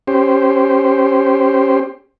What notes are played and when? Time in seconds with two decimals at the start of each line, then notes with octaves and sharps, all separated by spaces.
0.08 C#4 G4 C5